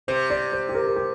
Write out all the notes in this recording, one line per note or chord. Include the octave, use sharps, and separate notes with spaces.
C3 C5
D5
C5
G4
A#4
A#4
G4